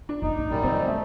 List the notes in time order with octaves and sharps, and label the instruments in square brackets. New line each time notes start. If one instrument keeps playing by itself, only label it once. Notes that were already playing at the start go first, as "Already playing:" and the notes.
[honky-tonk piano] D4
[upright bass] F#1 [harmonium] D#4
[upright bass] A#1 G#2
[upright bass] A#1 [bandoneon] F#2 G3
[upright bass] D3 E3 [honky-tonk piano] C4
[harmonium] A3